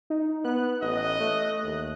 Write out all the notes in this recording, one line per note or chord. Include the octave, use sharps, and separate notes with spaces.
D#4
B3 F#6
A1 D#5
A3
D#2